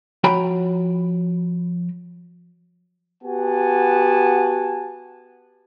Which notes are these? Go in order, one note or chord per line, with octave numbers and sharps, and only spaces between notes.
F3 F#4 C#5 G5 A#5 B5
B3 F#4 G4 F#5 G#5 A5